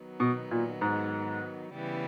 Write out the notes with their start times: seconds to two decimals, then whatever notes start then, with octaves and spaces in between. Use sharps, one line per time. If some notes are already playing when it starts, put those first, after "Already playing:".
Already playing: D#3 F#3 B3 D#4
0.20 B2
0.51 A#2
0.81 G#2
1.73 C#3 E3 G3 B3